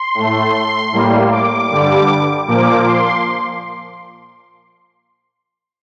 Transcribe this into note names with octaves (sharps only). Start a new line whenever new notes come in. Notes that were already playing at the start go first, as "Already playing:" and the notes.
Already playing: C6
A2 A3
A2 G3 A#3
D6
G2 D3 G3
A#2 F3 A#3 D6
C6